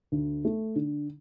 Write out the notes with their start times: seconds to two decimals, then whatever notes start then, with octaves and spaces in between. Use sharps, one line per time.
0.12 D2
0.45 A3
0.76 D3